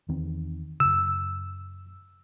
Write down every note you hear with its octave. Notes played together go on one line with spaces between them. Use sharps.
E2 D#3 C4
F#2 C#3 E6